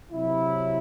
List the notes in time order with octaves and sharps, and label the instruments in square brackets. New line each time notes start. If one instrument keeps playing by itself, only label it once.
[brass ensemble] C3 F#3 E4